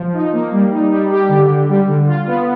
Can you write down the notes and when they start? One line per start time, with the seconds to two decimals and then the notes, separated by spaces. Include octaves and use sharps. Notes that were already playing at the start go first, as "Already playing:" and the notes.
Already playing: F3
0.14 D#4
0.33 A#3
0.52 G3
0.71 D#4
0.91 G3
1.10 G4
1.29 D3
1.48 D3
1.68 G3
1.87 D3
2.07 F4
2.27 B3